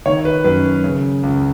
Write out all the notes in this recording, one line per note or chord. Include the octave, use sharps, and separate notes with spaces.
D#3 C#5
B4
F#2 B4
C#3
C#2